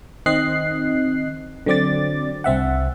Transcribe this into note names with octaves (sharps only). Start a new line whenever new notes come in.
D#3 C4 D#5 F#6 C7
D3 F#3 C4 D5 D6 A6
C2 C4 E5 F#5